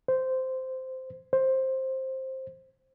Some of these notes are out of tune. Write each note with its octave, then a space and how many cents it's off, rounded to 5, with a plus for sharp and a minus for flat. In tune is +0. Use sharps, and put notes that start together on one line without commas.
C5 -10
C5 +10